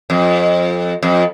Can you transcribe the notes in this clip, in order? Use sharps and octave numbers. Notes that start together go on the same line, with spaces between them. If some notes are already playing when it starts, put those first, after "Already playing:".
F2
F2